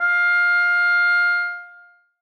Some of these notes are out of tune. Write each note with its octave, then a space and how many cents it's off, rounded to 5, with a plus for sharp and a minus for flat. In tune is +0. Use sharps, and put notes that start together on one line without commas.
F5 +15